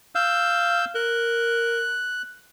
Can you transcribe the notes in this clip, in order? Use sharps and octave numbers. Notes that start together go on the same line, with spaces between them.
F5 E6 G6
A#4 F#6